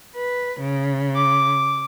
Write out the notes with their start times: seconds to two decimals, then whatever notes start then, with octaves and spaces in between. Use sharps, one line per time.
0.16 B4
0.60 C#3
1.15 D6